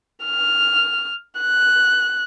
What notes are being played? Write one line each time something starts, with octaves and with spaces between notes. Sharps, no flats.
F6
F#6